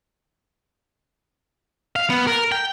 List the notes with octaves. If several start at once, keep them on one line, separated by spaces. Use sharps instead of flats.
F5
B3
A#4
G5